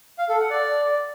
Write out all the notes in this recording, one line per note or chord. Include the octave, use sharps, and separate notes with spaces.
F5
A4
F#5
D5